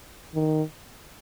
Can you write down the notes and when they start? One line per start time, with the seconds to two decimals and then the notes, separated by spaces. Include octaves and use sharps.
0.35 D#3